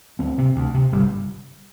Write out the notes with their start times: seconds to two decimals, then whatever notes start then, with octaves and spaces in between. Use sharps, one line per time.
0.19 D2 C4
0.38 C3
0.56 D2
0.74 C3
0.92 G1 G3